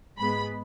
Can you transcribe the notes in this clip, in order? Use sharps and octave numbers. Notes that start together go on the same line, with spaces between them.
G#2 G#3 B3 B5